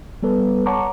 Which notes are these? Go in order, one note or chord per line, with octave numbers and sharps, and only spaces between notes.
G3 B3 A4 B4
C#5 F#5 A5 A#5 C#6 D6